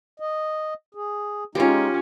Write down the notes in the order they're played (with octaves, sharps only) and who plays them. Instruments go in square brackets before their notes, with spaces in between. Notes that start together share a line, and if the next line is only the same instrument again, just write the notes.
[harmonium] D#5
G#4
[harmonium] G#3 D#4 [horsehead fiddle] C#4 [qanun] F4 G4